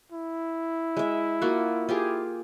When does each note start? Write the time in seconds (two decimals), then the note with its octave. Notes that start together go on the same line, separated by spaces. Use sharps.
0.12 E4
0.96 G#3 E5
1.42 A#3 F4 F#4
1.89 F4 G4 G#4